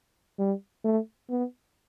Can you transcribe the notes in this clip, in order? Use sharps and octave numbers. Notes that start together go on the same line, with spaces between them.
G3
A3
B3